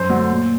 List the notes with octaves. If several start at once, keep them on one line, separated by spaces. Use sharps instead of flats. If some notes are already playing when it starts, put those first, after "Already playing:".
Already playing: F#2 C5
D3 F#3 A3
A#2